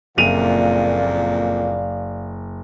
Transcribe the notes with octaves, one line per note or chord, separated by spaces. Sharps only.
F#1 F2 A#2 D5 F5 D#7 F7